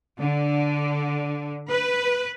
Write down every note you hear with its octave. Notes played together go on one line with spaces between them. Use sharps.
D3
B4